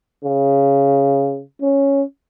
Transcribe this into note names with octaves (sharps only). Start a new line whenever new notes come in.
C#3
C#4